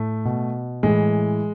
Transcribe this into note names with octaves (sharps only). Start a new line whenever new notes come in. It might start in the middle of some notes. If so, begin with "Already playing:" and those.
Already playing: A2 A3
B2
A2 E3 G#3